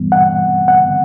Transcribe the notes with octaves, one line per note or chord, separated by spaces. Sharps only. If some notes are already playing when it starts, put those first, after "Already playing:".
Already playing: G2 E3 G3 B3
F#5
F#5